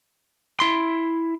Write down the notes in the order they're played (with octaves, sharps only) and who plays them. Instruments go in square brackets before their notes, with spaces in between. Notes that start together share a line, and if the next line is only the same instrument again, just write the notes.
[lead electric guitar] E4 C6